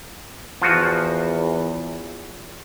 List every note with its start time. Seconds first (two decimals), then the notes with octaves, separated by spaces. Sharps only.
0.62 E2 F3 F4 F#4